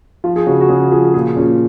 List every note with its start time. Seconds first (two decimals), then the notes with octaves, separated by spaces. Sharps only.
0.24 F3 F4
0.36 G#4
0.46 C#3 F#4
0.61 F#4
0.69 C#3 G#4
0.92 F3 G#4
1.14 A#2 G#4
1.37 A#2 C#4